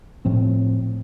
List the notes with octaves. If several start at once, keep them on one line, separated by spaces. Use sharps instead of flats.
A2 F3 C4